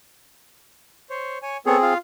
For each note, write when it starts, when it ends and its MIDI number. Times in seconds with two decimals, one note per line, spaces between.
1.10 1.38 72
1.10 1.38 73
1.42 1.57 73
1.42 1.57 80
1.66 1.77 59
1.66 1.94 60
1.66 1.94 68
1.66 1.77 69
1.66 1.77 73
1.82 1.98 65
1.82 1.98 77